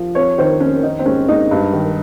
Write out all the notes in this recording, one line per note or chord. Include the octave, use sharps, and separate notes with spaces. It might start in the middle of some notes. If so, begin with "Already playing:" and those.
Already playing: F3
F2 C#5
D#3 C5
F2 C#4
D#3 D#4
C4
G#2 C#4
G#2 D#4
G2
D#3